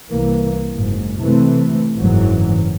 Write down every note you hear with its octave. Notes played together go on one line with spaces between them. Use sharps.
C2 E3 A#3
F#1 G#2
C3 E3 A3 C4
F#1 G#2 E3 F#3